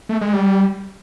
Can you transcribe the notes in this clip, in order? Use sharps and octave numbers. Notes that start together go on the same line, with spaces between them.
A3
G#3
G3